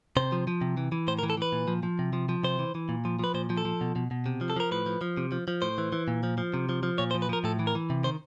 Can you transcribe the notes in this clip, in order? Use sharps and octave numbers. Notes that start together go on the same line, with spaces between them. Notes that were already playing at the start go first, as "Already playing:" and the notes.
C3 C5
F3
F3
C3
E3
E3
A2 C5
A#4
E3
A4
E3 B4
A#2
F3
F3
C3
F3
F3
C3 C5
E3
E3
A#2
F3
F3 B4
A#2 C5
F3
A4
F3
B2
B2
B2
C3
F3
A4
F3 A#4
A2 B4
F3
F3
C3
F3
F3
A2 C5
E3
E3
A#2
F3
F3
C3
F3
F3
A#2 C#5
C5
F3
B4
F3 A#4
A2 A4
E3
A#4
E3
C3
D#3 C5